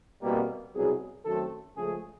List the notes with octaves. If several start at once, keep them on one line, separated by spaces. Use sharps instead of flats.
C2 B2 G3 A#3
C2 B2 F#3 G#4
F#2 D#3 F#3 A3 C4 A4
C#2 C#3 F3 A3 G#4